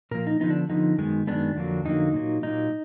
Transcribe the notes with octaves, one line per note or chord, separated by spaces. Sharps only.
A#2 F3 A#3 A#4
D#4
D3 F3 B3 D#4
D4
D3 F3 B3 D#4
F#2 D#3 G#3 B3
F#2 D#3 G#3 B3 D4
F2 D3 F#3 A#3
F2 D3 F#3 A#3 D#4
A#2 F#3 A#3
A#2 F#3 A#3 D#4